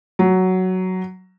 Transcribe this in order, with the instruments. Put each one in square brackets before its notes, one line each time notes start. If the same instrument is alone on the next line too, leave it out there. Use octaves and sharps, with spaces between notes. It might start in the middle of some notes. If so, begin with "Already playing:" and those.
[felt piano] F#3